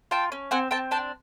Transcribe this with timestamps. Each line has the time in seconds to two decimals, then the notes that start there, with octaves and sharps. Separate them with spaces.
0.11 F4 G5 A5
0.32 C#4
0.51 C4 F#5 G#5
0.71 C4 G5 A5
0.91 D4 G5 A5